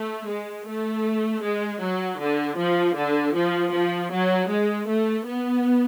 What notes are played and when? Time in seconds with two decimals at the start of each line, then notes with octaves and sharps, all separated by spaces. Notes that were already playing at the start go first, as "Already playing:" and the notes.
Already playing: A3
0.27 G#3
0.66 A3
1.42 G#3
1.81 F#3
2.20 D3
2.57 F3
2.95 D3
3.34 F3
3.73 F3
4.11 F#3
4.48 G#3
4.88 A3
5.25 B3